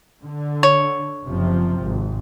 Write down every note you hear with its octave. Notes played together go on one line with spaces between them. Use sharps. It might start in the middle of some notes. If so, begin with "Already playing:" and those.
D3
C#5
F#1 C3 F3
G#1